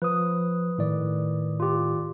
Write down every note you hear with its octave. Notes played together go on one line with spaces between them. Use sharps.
F3 B4 D#6
A2 D#3 D5
F4 G4